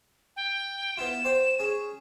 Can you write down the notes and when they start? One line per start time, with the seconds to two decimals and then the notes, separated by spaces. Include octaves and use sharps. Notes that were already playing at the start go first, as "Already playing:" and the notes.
0.36 G5
0.97 B3 E4 F4 E7
1.24 C5 D5 G5
1.59 C#4 G#4